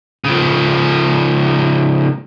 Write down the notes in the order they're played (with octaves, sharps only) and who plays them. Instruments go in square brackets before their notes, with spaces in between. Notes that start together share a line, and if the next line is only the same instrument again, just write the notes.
[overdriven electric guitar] C#3 F3